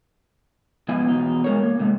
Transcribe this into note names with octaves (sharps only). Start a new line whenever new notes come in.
G#2 F3 B3 E4 D#5 G#5
E2 B2 D#4
G#3 A#4 C#5
A#3
A2 C3 G#3